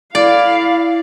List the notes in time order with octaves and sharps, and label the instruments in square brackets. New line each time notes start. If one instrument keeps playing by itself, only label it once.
[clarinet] E4 [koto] D5 [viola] F5